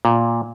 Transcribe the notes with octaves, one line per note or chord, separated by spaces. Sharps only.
A#2